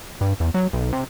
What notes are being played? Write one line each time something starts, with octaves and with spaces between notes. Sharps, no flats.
G2
E2
F#3
B1
C3